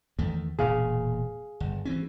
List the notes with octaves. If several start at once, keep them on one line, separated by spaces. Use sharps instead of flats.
E2 D#3 A3
E1 A#2 G#4 F5
G1
E3 C4 C#4